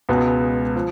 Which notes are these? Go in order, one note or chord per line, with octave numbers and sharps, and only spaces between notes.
C#2 B2 G#3 B3
F3